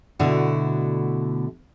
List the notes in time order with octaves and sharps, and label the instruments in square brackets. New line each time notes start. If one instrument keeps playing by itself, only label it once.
[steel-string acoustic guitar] B2 D3 A3 E4 F#4